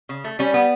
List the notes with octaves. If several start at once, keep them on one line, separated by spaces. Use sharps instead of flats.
C#3
A3
G3 C#4
B3